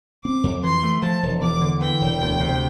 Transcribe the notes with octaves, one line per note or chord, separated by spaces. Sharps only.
C4 D6
F2
E3 C6
A3
F3 A5
E1
E2 D6
D3
E3 G5
E1
D2
C3